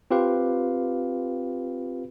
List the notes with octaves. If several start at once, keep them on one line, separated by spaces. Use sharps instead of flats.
C4 F4 G4 B4 F5